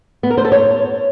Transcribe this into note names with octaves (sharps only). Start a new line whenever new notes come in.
B3
A#4
C5
A4
C#5